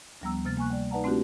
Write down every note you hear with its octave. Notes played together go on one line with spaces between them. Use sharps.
D2 F3 G3 B3 A#5 E6
C3 A#3 F6 A6
A#3 G#5 C#6 F#6
G3 D5
D#4 B4 D5 F#5 A5 A#5
A3 C4 D4 E4 F#4 G4